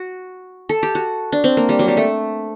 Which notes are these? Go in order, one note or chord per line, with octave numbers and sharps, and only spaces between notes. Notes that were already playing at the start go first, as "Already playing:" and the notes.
Already playing: F#4
A4
G4
F#4
D4
C4
A#3
G3
F#3
G3
A3